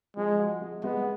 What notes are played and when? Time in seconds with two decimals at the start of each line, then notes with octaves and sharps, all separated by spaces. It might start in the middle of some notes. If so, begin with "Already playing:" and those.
0.17 F3 G#3
0.39 F#4
0.61 G#3
0.84 G#3 B3